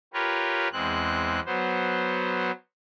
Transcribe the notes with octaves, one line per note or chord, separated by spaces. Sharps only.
F4 G4 A#4 B4 C#5
E2 G#3 C4 F#6
F#3 B3 C5